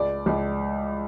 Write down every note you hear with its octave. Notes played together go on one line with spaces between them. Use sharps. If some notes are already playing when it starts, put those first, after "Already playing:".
Already playing: C#2 D5
C#2